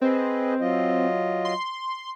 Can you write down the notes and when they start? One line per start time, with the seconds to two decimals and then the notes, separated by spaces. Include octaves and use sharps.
0.01 C4 G#4 B4 D#5
0.60 F#3 F4 D#5
1.45 C6